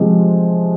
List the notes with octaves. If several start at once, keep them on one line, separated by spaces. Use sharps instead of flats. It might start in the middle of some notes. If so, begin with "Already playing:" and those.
Already playing: C3 F3 G#3